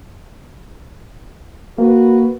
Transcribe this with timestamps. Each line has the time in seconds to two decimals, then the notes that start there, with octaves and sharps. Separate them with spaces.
1.78 A#3 F#4 B4